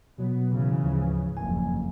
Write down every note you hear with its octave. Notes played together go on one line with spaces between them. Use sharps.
B2 F#3 B3
G#2 C#3 E3
D2 F3
F#1 F2 G#5